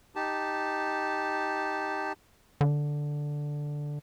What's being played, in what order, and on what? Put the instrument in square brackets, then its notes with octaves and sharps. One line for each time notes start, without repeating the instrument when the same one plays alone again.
[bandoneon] D#4 G4 A5
[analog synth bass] D3